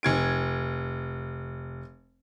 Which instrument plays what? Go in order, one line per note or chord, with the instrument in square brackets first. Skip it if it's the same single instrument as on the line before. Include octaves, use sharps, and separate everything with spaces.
[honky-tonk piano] F1 G#6 D7